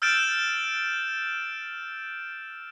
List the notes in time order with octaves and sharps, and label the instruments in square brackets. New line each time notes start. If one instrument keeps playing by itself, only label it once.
[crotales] E6 F6 G6 A6 D7 E7